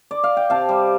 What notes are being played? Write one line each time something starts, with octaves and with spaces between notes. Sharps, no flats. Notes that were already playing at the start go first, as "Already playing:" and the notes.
Already playing: C5
D5
F5
G5
C3 F5 A5
G3